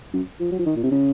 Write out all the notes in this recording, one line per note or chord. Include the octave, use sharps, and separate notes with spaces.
F#2
F3
F#3
F3
D#3
A#2
C3
C#3